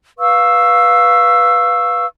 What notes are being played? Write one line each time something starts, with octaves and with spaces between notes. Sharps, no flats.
B4 F5 C#6 E6